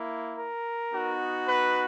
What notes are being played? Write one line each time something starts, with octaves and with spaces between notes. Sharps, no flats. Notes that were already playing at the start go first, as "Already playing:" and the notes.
Already playing: A#3 E4
A#4
B3 D#4 F#4
B4